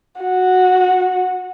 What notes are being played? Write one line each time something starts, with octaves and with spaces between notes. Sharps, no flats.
F#4